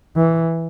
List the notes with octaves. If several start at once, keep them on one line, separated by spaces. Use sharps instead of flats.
E3